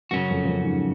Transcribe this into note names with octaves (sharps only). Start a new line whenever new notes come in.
F#2 C#3 F#3 C#4 F#4
F2
F2
F#2
G#2